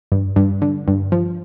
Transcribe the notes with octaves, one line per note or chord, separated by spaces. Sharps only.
G2
G2
D3
G2
F3